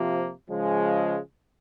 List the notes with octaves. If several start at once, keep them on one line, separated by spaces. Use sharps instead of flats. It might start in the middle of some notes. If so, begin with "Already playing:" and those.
Already playing: C3 F3 A#3
C#3 F3 G#3